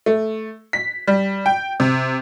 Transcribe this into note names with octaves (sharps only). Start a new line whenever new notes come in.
A3
B6
G3
G5
C3